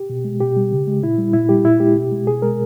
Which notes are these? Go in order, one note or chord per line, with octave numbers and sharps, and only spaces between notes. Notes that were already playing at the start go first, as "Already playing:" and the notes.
Already playing: G4
B2
G#3
B2 G4
G3
C#3
G#3
A#2 E4
G3
A#2 E4
G3 G4
A#2 E4
G#3 G4
B2
G#3
B2 G#4
G#3 A#4